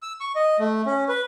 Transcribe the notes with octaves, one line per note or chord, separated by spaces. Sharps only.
E6
C#6
D#5
A3
C#4
B4